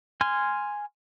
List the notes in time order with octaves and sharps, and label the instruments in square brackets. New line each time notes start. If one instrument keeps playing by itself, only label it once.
[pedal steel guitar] G#5 C6 F6